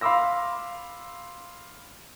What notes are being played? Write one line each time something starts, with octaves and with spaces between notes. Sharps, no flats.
F5 B5 C6 D6 E6 A#6